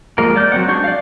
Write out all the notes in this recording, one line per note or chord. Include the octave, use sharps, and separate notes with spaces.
F3 G#3 A#3 A#4
A#3 D5 G6
F#3 C4 F#5
G#3 D4 C#6 G6
D5 F5